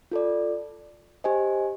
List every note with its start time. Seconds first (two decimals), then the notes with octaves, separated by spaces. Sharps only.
0.11 F4 A4 D5
1.24 G4 C5 D#5 G#5